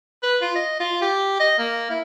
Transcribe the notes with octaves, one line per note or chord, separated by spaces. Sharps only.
B4
F4
D#5
F4
G4
D#5
A#3
E4